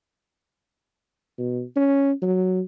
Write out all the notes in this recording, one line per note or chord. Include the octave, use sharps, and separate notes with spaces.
B2
C#4
F#3